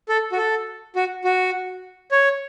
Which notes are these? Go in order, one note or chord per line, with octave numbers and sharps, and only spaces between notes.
A4
F#4
A4
F#4
F#4
C#5